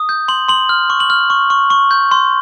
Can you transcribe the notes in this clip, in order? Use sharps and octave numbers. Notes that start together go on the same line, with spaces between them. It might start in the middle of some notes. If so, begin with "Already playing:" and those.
Already playing: D#6
G6
C6 F#7
C6 F#7
F6
C#6
F#7
F6
C#6
C#6
C#6
G6
C6